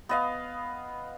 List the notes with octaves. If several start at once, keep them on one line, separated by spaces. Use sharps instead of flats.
B3 D#5 F5